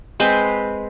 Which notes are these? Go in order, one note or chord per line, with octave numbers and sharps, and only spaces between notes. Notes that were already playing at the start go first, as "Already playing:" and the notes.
G#3 C4 B4 C5